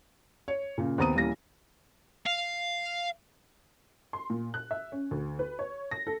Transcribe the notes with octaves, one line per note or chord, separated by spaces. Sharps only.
C#5
A#2 C#3
D#2 B3 C4 A#5 D#6 D#7
D#1 E3 A#3 A#6
F5
C6
A#2
F#6
E5
C#4
D2
B4
C#5
A#6
A4